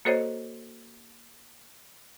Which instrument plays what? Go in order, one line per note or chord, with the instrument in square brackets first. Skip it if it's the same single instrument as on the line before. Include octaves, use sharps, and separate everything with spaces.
[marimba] A#3 F#4 A4 C5 C#5 D#5